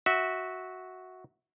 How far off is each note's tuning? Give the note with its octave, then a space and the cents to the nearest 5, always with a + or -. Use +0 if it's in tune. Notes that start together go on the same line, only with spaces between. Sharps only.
F#4 +0 E5 -20